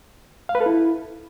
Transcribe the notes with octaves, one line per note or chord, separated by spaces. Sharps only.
F5
B4
A4
E4